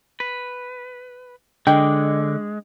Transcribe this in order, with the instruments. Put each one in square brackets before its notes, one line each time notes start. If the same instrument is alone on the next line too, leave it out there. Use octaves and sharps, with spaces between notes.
[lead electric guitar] B4
[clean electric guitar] D3 [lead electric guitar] G#3 [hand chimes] D4 D#5 D6 [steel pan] G5